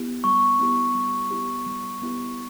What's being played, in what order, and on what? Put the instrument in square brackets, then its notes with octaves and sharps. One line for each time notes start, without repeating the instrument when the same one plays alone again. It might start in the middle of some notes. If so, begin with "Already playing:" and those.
Already playing: [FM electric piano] B3 E4 G4
[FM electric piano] G3 [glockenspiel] C#6
[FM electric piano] B3 E4 G4
G3
B3 E4 G4
G3
B3 E4 G4